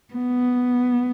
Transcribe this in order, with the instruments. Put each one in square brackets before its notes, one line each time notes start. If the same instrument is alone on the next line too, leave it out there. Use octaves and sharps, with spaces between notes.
[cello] B3